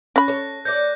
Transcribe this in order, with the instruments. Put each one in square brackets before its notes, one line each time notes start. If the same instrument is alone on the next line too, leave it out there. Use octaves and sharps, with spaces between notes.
[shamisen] C#4 B5 [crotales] F#6 A#6
[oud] A4 C#5
[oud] C#5 D5 [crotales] G6 A#6